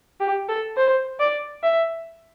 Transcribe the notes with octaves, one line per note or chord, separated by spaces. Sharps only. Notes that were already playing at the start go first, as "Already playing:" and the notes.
G4
A4
C5
D5
E5